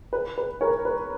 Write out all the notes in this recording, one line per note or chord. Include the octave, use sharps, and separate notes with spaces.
B4
B4
A#4 C#5
B4